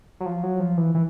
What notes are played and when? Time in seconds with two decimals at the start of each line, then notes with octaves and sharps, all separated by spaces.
0.20 F#3
0.26 F3
0.43 F#3
0.60 F3
0.77 E3
0.95 E3